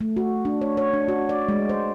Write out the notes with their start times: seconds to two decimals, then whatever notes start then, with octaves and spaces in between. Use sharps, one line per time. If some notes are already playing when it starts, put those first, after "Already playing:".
0.01 A3
0.17 F#4
0.45 D4
0.61 C#5
0.77 C#5
0.93 D4
1.08 F#4
1.29 D5
1.49 G#3
1.69 C5